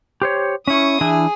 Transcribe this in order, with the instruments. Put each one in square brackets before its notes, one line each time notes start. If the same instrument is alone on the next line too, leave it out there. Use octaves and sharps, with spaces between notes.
[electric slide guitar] G4 C5 C#5
[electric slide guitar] C#4 E4 [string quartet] C#6 D#6
[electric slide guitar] E3 D4 E4 [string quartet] G#4